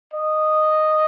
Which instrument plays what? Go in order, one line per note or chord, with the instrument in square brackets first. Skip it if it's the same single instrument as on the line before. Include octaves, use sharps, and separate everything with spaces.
[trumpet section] D#5